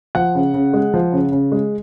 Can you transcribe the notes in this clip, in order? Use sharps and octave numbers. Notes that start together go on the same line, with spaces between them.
F3 F#5
C#3
C#3
G#3
F3
C#3
C#3
G#3